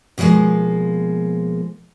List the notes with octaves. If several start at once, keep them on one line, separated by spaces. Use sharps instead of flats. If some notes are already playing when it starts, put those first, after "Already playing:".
B2 F3 F#3 G#3 A#3